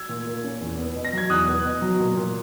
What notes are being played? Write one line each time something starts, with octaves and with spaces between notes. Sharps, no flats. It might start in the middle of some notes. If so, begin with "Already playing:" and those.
Already playing: E6 G#6
A#2
A#3
C#4
E2
B3
B2
A#6
F#3 G#6
E2 D#6 F#6
B3
B2
F#3
A#2
A#2